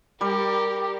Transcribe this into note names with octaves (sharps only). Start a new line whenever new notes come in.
G3 G4 A#4